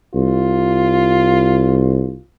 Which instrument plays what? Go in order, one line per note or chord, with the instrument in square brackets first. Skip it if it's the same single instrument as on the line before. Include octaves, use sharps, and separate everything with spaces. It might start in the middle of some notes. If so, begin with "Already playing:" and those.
[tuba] C2 [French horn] F4